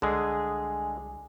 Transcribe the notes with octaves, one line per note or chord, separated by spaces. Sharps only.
C2 D3 G#3 G#4